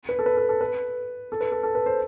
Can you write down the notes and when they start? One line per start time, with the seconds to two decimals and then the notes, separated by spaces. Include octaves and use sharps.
0.09 B4
0.19 A4
0.26 B4
0.37 A4
0.49 A4
0.61 B4
1.32 A4
1.41 B4
1.52 A4
1.63 A4
1.75 B4
1.86 C5